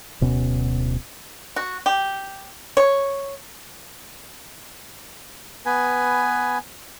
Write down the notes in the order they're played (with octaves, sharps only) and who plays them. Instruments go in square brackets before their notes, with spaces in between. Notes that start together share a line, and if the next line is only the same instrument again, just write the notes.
[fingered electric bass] D1 B2 C#4
[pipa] F#4
G4
C#5
[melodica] B3 B4 G#5